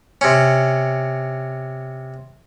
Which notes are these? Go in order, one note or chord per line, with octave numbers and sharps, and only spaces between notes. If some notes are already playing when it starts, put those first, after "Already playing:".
C3 C#4